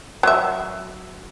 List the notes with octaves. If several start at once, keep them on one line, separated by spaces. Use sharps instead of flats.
F#3 E5